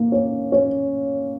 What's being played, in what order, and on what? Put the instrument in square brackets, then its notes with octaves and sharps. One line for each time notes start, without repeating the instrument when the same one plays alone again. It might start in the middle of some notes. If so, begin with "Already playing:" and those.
Already playing: [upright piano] A#3
C#4
C#4